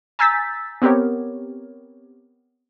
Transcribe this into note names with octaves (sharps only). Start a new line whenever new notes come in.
G#5 A#5 E6 G6 A6 B6
B3 C4 G4 A#4 C#5